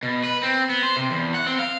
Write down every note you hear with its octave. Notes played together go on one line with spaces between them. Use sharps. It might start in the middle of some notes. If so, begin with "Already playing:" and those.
B2
B4
C4
B3
C5
C3
E2
F#5
C4
F5